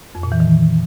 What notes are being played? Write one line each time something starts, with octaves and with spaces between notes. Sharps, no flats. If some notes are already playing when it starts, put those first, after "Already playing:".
F2
A#2
E3
D#3